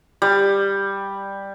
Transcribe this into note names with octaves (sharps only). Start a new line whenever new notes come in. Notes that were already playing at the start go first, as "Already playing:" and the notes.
G3